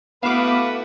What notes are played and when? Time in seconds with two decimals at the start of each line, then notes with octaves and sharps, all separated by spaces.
0.23 A3 B3 E4 F#4 B4 F5 D6